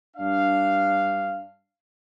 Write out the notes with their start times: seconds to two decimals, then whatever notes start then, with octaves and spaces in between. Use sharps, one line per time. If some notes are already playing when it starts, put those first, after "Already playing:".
0.17 G2 D4 F5